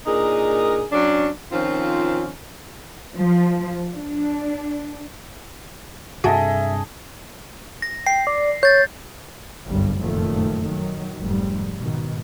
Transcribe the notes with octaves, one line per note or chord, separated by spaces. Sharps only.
A#2 D4 D#4 G#4 A#4
F#3 C#4 D4
D#3 F3 C4 C#4 F4
F3
D4
G2 C3 F#4 G#4 A4 D#5 E5
A#6
G5 C7
D5
C#5 G6 A6
G1 C2 F#2 G3
F1 F#2 A#2 D#3 F3 A3
D#3 F#3
F1 G#2 G3
G#2 B2 D#3